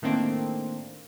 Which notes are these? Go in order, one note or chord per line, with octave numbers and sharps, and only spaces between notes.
A2 D#3 A3 A#3 C4 D4